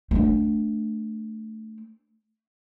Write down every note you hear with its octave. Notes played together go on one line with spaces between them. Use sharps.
A3 D4